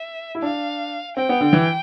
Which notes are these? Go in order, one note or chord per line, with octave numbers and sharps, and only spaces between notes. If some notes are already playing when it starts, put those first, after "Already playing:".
Already playing: E5
E4
D4 F5
C4 G5
B3
D3
E3